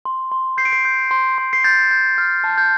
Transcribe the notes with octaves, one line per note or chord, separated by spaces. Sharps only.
C6
C6
G6 C7
D7
C7
G6
C6
C6
C7
G6 A6
G6
F6
A5
G6